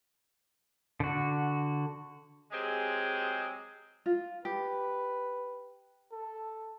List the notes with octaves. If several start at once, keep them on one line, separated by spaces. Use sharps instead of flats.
D3 F#4
F#3 G#3 C4 G4 G#4
F4
G4 B4
A4